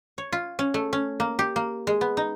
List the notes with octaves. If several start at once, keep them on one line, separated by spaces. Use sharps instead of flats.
C#5
F4
C#4
A3
C#4
A#3
G4
A#3
G#3
B3
D#4